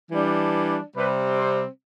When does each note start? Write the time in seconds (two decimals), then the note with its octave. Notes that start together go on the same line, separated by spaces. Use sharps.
0.11 E3 G3 D4
0.96 C3 G3 C4 B4
1.39 C5